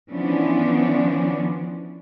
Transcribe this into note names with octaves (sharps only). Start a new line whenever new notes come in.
E3 F3 B3 C#4 D4